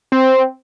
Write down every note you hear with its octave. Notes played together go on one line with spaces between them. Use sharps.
C4